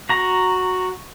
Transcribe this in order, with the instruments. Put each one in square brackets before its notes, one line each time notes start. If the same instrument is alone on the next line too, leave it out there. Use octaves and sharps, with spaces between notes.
[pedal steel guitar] F#4 A#5